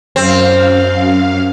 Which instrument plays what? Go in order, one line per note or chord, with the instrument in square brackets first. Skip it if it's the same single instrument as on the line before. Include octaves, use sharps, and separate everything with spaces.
[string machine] F#2 F5 [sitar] C4